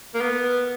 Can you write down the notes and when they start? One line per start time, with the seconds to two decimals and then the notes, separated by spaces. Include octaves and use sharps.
0.14 A#3
0.20 B3